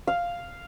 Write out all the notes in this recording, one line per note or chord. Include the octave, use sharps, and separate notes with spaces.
F5